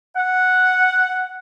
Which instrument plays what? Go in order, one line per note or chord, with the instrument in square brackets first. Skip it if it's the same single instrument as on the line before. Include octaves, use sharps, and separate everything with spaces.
[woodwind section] F#5